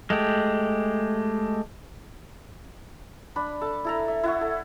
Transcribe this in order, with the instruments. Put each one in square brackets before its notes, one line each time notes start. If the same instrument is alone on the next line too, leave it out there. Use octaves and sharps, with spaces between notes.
[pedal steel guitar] G#3 A3 G4
[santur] D4 B5
A4 A5
E4 A4 A#5
E5
E4 F#5 C#6
A4